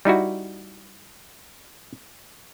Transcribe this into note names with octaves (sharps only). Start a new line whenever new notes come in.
G3 D#4 E4 F#4